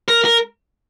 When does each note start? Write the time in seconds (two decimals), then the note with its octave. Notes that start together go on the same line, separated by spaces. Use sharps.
0.08 A#4
0.25 A#4